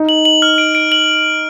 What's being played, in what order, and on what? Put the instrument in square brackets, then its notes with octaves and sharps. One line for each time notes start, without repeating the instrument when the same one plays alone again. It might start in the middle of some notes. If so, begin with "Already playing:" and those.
Already playing: [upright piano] D#4
[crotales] F#7
F#7
F6
D7
D7
F#7